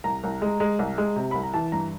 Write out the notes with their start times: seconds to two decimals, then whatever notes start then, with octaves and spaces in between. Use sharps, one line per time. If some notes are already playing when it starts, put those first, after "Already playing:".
0.04 C2 A#5
0.24 C2
0.42 G#3
0.60 G#3
0.79 C2
0.98 G#3
1.16 C3
1.31 C2 B5
1.43 A#5
1.54 E3 A5
1.72 G2 A#5